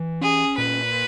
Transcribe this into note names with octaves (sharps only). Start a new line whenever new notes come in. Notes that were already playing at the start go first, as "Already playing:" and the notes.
Already playing: E3
C#4 G#4
A#2 B4